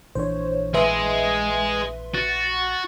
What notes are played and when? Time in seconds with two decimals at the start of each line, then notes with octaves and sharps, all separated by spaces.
0.15 A#1 E3 D4 C5 C#5
0.74 G#3 G#4 B4 E5 C6
2.15 F#4 A6